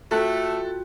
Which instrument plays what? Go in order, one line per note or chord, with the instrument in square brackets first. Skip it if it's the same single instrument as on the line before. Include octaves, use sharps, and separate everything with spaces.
[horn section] A3 [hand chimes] F4 F#4 G5 [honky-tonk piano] A4 F#6